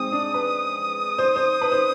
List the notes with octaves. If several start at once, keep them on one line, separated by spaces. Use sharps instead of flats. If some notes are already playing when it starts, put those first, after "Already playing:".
Already playing: G#3 C4 D#6
D4
B4
C5
C5
B4
C5